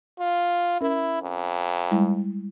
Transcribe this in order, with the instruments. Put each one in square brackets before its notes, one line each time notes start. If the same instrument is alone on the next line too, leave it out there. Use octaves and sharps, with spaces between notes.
[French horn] F4
[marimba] C#4 A#4 [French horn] E4
[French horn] F2
[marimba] G3 G#3 E4